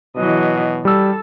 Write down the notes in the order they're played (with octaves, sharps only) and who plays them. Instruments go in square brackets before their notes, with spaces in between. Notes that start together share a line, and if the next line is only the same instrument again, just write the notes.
[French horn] B2 [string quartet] E3 F#3 D#5
[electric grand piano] G3 E6 [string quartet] A4